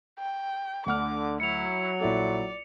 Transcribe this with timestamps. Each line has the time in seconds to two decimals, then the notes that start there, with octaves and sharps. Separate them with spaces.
0.19 G5
0.86 D2 D3 F#5 D6 F6
1.40 F#3 E4 C#7 F7
2.00 A#1 E4 A4 D5